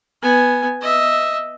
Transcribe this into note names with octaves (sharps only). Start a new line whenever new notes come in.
B3 G#5
D#5 E5